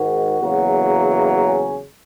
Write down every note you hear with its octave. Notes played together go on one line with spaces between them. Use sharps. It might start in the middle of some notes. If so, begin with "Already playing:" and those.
Already playing: G#2 D#3 G#3 F#4
E2 C#3 F#3 A#3
C#4